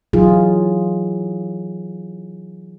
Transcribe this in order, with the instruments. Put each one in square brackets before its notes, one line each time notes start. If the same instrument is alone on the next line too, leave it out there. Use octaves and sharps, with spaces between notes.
[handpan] E3 F#3 D#4 F4 G#4